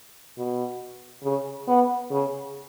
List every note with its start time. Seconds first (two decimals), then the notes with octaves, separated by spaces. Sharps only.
0.38 B2
1.23 C#3
1.68 B3
2.11 C#3